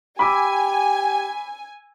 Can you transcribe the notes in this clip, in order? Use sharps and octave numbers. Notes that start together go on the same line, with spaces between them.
G4 G#5 B5 D6 E6